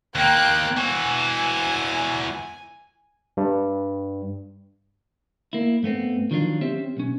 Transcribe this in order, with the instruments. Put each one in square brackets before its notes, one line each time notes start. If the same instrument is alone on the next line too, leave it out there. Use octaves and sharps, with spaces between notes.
[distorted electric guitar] D#2 A#3 [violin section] G5 F#6
[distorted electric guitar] E3 F#4 [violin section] G#5
[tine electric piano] G2
[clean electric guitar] A#3 E4
G2 A3 B3 C4
D#3 F3 F#3 D4 F4
C4 C#4 G4 C5 E5
B1 C#4